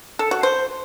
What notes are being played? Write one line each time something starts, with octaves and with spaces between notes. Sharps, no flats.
A4
F#4
C5